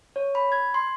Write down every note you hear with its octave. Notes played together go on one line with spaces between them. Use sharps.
C#5
B5
G#6
C6